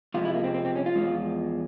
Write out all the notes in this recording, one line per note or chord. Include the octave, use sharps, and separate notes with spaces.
F2 C3 F3 G#3 F4
E4
A#3
C4
C4
C4
C#4
F4
E2 C#3 F3 G#3